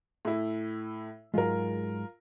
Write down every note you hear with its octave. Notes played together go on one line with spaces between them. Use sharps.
A2 E4
G#2 F#3 G#3 F4 A#4